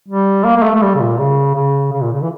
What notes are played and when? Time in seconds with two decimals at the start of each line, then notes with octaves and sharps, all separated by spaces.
0.08 G3
0.45 A#3
0.57 A#3
0.63 A3
0.75 A3
0.82 G3
0.95 C#3
1.00 A#2
1.18 C#3
1.54 C#3
1.92 C#3
2.02 A#2
2.12 C#3
2.22 E3